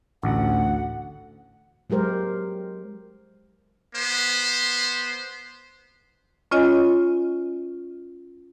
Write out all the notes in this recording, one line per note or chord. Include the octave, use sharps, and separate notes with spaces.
A1 D2 F#5
F#3 G#3 G4 A#4 C5
B3 C5
C#4 F4 C#5 D#5 G#5